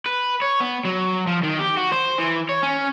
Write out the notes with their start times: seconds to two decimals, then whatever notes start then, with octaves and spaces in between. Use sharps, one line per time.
0.06 B4
0.42 C#5
0.60 B3
0.85 F#3
1.27 F3
1.43 D#3
1.59 G4
1.77 F#4
1.91 C5
2.18 E3
2.49 C#5
2.63 C#4